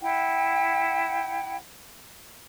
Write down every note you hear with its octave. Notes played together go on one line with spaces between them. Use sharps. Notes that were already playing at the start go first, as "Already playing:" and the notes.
E4 F#5 G5